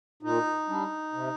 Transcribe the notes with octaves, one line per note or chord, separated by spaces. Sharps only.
A#2 D#4
G3 D4
C3